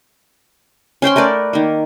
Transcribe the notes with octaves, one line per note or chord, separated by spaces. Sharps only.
C#4 C5 G5 C6
A3 A#4 B4 D5
D#3 A#3